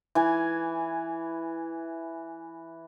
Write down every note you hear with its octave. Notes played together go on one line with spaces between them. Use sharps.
E3 G#5